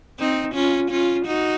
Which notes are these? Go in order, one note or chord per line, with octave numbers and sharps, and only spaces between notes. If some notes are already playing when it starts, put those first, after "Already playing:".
C4 D#4
C#4 F4
C#4 F4
D#4 F#4